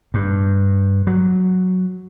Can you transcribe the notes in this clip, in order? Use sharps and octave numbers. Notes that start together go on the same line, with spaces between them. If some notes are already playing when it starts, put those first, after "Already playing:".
G2
F#3